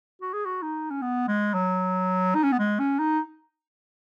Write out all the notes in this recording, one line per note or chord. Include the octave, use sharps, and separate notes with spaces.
F#4
G#4
F#4
D#4
C#4
B3
G#3
F#3
D#4
C#4
B3
G#3
C#4
D#4